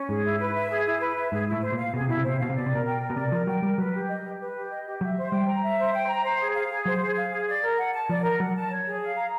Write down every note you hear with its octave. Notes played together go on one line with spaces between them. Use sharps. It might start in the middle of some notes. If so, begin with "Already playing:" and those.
Already playing: C#4
G#2 G#4
E4
B4
E5
G#4
E4
B4
E5
G#2 G#4
A2 E4
C5
A#2 F5
B2 G#4
C3
B2 E4
C3
B2 C5
C3
B2 F5
C3
B2 D5
C3
B2 A#4
G5
A#4
B2
C3 D5
F3 A#4
F#3 G5
G3 A#4
F#3 B4
G4
D#5
G4
B4
G4
D#5
G4
F#3 E5
C5
G3 G5
A#5
E5
C5
G5
A#5
C5
G#4
F5
G#4
F#3 C5
G#4
F5
G#4
D5
A#4
F#5
A5
F3 D5
A#4
F#3 F#5
A5
C#5
G#4
F5
A#5